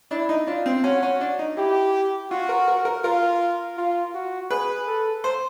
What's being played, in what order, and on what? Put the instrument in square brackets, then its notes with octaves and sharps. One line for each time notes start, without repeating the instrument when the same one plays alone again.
[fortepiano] D4 [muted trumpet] E4
[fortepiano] D#4
[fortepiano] D4 [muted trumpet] F4
[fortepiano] C4
[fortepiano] C#4 [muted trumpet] F#4
[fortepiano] C#4
D4
D#4
[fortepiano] E4 [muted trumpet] G4
[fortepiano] F4 [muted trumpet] F#4
[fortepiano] A#4
A#4
A#4
[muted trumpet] F4 [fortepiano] A#4
[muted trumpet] F4
F#4
[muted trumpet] G#4 [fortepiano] B4
[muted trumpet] A4
[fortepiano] C5